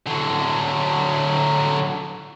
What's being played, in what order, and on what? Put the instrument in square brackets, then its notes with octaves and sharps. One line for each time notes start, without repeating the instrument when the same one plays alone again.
[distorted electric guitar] D3 F#3